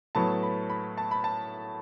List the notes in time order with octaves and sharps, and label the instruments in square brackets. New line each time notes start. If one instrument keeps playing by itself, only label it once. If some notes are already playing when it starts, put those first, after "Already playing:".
[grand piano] A2 F#3 B3 A5
B5
B5
A5
B5
A5